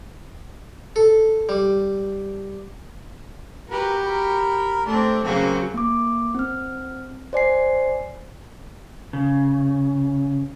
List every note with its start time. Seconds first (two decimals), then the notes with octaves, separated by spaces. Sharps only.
0.96 A4
1.49 G3
3.70 F#4 G4 A#4 B4
4.05 A#4 B5
4.86 A3 C4 D4
5.24 C#3 F#3 A#3 C4 F#4 C5
5.74 A#3 D6
6.35 C4 F6
7.33 C5 D5 G#5 C7
9.13 C#3